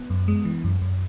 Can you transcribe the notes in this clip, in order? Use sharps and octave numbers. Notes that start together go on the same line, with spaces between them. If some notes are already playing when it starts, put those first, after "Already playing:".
Already playing: B3
F#2
G#3
E3
F#2
F#2